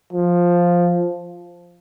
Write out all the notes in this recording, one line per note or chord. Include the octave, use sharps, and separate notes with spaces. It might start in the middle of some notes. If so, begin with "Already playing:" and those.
F3